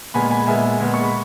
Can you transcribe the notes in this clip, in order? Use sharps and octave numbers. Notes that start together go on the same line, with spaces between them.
A#2 G#3 B3 G#5 B5
G#5 B5
A#2 G#3 B3 E5 G#5
A#2 G#3 B3
C#6
B5